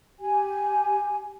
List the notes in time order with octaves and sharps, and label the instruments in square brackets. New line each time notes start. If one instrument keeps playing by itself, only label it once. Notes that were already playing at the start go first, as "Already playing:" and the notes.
[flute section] G4 G#5